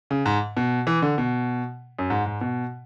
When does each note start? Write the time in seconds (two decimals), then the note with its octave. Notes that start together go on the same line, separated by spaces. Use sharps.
0.11 C#3
0.26 G#2
0.57 B2
0.87 E3
1.02 D3
1.18 B2
1.99 F#2
2.10 G#2
2.26 G#2
2.41 B2